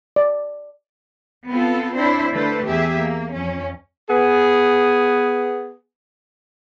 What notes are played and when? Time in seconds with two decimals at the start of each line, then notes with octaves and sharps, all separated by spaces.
0.16 D5
1.49 B3 C4 F4 A4
1.96 C4 D4 E4 C5 C#5
2.32 D3 A3 A4 B4 C5
2.65 E2 G4 G#4 E5
2.96 A#3
3.32 F2 C#4
4.10 B3 G#4